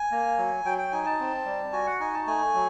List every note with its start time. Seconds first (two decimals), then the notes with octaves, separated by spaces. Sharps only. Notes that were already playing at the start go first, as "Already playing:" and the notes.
Already playing: G#5
0.11 A#3
0.38 F#3
0.65 F#3 G5
0.78 G5
0.92 D#4 G#5
1.06 A5
1.20 C4
1.46 G3
1.73 F#4 G#5
1.87 F#5
2.00 D#4 G#5
2.14 A5
2.27 A3 G#5
2.54 F#3